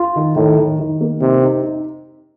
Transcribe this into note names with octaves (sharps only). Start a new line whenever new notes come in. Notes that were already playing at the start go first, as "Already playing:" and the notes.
Already playing: F4
D#3
A2 D#3
D#3
D#3
A#3
C3 D#4
D#4
D#4